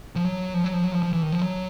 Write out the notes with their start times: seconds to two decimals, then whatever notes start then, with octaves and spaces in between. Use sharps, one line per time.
0.16 F3
0.25 F#3
0.54 F3
0.64 F#3
0.74 F3
0.83 F#3
0.93 F3
1.03 F3
1.13 E3
1.22 D#3
1.32 F3
1.42 F#3